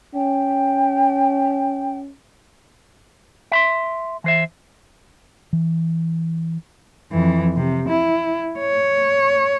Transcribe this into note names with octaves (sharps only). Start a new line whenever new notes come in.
C#4 G5
E5 B5 C6
E3 C5 E5
E3
F2 E3
C3
E4
C#5